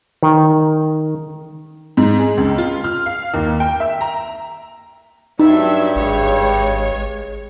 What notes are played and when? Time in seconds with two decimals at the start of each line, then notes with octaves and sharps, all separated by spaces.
0.23 D#3
1.97 G#2
2.19 G#4
2.37 C#2
2.58 F4
2.84 F6
3.06 F5
3.34 D#2
3.60 G5
3.80 E5
4.01 A#5
5.39 G2 F#3 D#4 E5
5.95 G#1 G#3 C#5